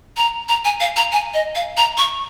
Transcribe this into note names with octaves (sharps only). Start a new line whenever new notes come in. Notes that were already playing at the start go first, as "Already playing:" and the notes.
A#5
A#5
G#5
F5
A#5
G#5
D#5
F5
A#5
C#6